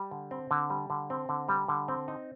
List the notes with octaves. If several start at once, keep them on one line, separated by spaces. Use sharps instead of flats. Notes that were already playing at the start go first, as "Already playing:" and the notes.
Already playing: G3
D3
C4
D3
G3
D3
C4
D3
G3
D3
C4
D#4